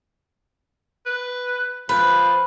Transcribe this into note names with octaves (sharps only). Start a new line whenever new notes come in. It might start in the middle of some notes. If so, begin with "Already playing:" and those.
B4
F3 B4